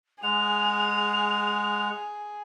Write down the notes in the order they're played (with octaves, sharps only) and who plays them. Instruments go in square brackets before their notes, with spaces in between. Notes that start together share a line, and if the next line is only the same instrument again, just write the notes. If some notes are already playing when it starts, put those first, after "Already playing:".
[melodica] G#3 F#5 [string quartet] G#4 [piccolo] F7